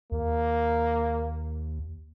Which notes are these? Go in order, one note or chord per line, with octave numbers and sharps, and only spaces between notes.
D#2 A#3